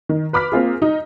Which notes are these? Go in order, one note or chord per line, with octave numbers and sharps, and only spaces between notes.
D#3
B4 B5 D6 F6 B6
A#3 C4 F4 G#4
D#4 D#5